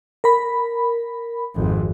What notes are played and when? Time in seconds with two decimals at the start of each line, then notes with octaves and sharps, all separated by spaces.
0.24 A#4 B5
1.56 G#1 F2